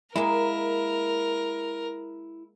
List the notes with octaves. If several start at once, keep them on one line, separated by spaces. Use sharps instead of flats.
G#3 A#3 E4 A#4